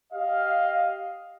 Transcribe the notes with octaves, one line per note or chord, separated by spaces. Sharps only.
G4 D#5 F5